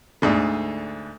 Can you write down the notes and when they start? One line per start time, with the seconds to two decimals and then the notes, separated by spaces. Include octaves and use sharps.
0.22 D2 G#2 D3